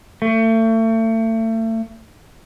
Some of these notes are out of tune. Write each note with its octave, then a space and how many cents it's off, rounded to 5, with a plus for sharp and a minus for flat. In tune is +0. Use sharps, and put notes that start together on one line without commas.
A3 +35